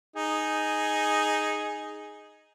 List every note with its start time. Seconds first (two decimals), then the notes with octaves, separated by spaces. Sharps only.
0.16 D#4 G#4